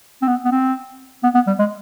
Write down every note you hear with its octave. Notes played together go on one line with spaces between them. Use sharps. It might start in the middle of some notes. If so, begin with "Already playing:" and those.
C4
B3
B3
C4
B3
B3
G3
G#3